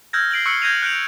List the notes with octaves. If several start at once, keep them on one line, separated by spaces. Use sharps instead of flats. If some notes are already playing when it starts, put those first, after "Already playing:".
E6 F6 G6 G#6 A#6
C7 D7 F#7 G7
C#6 E6 F#6 C#7 G7
G6 G#6 A#6 D#7 F7
F#6 G6 D7 F7